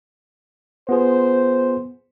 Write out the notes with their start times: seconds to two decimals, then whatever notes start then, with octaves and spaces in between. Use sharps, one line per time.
0.89 B3 F4 G#4 C5